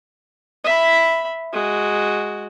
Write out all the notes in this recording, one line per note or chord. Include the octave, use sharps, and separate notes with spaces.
E5 B5
G#3 F#4